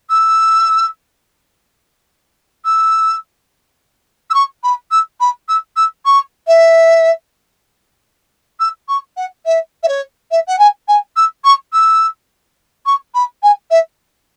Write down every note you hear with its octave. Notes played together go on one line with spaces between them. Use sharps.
E6
E6
E6
C#6
B5
E6
B5
E6
E6
C#6
E5
E6
C#6
F#5
E5
E5
C#5
E5
F#5
G#5
G#5
E6
C#6
E6
C#6
B5
G#5
E5